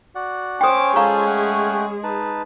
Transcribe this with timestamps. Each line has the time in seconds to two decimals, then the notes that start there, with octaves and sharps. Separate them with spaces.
0.15 F#4 D5 F#5
0.61 C#4 C5 G5 D6 D#6
0.96 G#3 F4 G#4 A4 C5 F5 A#5 C#6
1.27 A3 F#5 G5
2.04 D#4 B4 A5